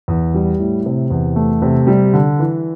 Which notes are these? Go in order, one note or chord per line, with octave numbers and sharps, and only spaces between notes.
E2
G3
A2
C3
E2
A3
C3
G3
D3
E3